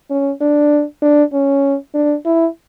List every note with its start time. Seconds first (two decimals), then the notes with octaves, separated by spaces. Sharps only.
0.10 C#4
0.41 D4
1.02 D4
1.33 C#4
1.94 D4
2.25 E4